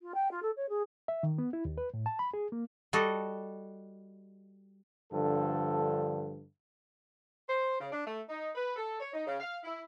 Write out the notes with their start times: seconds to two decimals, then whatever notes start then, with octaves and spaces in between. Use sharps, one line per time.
0.01 F4
0.15 G5
0.31 F4
0.42 A4
0.56 C#5
0.69 G#4
1.08 E5
1.23 D#3
1.38 B3
1.53 E4
1.65 D#2
1.78 B4
1.94 A2
2.06 A5
2.19 B5
2.34 G#4
2.52 A#3
2.93 G3 F#4 A4 D#5
5.12 G2 D3 F3 A4
7.48 C5
7.80 C#3
7.92 D4
8.06 A3
8.29 D#4
8.55 B4
8.76 A4
9.00 C#5
9.14 D#4
9.27 C#3
9.40 F5
9.64 E4